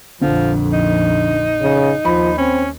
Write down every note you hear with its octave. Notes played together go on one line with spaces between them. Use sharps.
A#1 F2 D3 F3
D#4
C#3
D#2 F3 B5
C4 C#4